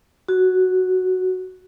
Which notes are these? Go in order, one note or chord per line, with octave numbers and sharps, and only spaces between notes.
F#4